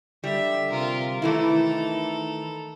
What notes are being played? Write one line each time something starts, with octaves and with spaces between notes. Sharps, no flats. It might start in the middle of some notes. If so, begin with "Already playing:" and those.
D3 G3 E5
C3 F4 A#4
D#3 E3 A3 E4 A4 A#5